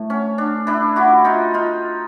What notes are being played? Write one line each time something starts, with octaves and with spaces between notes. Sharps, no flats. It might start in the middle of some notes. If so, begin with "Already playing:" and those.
Already playing: A2 A3
C#4
D4
D4 E4
E4 F#4
D#4 F4
D#4 F4